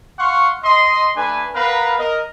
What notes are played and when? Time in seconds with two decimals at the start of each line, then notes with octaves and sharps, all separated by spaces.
0.19 F5 F#5 C6 C#6
0.64 D#5 C6
1.16 A3 D4 B4 G#5
1.55 B3 A#4 B4 F5 A#5
1.99 A#4 D#5